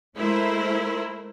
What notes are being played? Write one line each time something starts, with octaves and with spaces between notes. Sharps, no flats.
G#3 A3 E4 A#4 C5